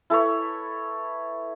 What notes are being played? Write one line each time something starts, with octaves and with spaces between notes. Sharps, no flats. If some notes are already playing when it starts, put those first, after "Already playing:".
E4 A4 B4 C#5